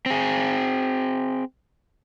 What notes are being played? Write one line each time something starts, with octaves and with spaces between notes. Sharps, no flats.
C4 G#4